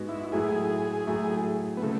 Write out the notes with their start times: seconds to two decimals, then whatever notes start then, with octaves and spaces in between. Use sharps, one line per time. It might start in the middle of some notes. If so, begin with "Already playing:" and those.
Already playing: G#2 G#3 B3 F#4
0.08 E4
0.32 A2 F#3 A3 E4 G#4
1.07 A2 F#3 A3 E4
1.77 B3
1.82 C#3 A3